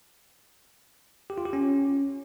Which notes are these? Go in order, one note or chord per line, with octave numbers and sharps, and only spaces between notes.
G4
F4
G4
C#4